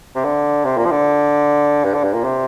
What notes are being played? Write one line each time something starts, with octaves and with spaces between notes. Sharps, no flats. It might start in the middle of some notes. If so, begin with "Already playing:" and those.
C3
D3
C3
A#2
F3
D3
G2
D3
G2
A#2
C3